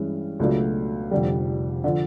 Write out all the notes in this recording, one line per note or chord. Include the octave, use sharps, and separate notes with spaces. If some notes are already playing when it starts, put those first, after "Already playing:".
Already playing: G2 E3 G#3 C#4
C#2 B2 F#3 A3 D4
F1 F2 D3 G3
D3 F3